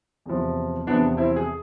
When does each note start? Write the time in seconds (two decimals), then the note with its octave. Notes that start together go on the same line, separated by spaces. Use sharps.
0.26 E2 C3 F3
0.87 E2 C3 F3 B3 D4
1.17 C4 E4
1.36 G#4